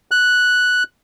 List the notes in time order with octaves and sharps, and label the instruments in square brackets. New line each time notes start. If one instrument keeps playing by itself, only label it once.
[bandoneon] F#6